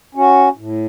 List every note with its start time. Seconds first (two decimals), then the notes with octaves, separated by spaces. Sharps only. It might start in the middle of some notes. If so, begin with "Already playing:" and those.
0.15 C#4 F#4
0.57 A2